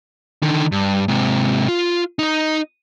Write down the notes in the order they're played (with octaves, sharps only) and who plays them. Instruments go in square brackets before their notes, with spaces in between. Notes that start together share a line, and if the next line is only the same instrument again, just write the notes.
[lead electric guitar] D3 D#3
G2
G#2 C3
F4
D#4 D#5